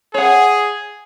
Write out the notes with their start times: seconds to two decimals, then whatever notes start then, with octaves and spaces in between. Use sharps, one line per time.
0.14 G#4 C#5 F#5